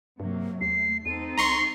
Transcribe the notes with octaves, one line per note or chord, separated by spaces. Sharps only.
G2 C3 F#3 A#3
D#2 A3 C7
E2 C4 D#4 A4 D#7
C2 A#5 C6 C#6 C7